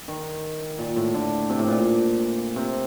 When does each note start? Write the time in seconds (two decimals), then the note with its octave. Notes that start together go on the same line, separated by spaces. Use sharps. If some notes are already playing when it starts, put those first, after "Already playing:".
0.08 D#3
0.78 A#2
0.96 A2
1.14 D3
1.50 C3
1.59 A2
1.68 A#2
2.56 C3